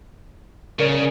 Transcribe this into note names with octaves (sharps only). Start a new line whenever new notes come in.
C#3 A#4 C#5 D5